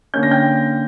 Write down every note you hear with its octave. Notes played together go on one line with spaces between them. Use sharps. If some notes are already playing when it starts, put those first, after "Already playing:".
D3 A#3 C#4 G6
A#6
G5 G6